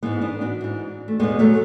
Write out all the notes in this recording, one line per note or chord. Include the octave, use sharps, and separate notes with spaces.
G#2 E3 G#3 B3
B3 D4
D4 F#4
G#2 E3
A3
E2 B2 G#3 B3
F#3 A3